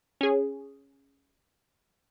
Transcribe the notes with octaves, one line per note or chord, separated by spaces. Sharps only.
C#4 G#4